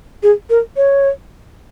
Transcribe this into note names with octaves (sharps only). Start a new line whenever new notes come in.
G#4
A#4
C#5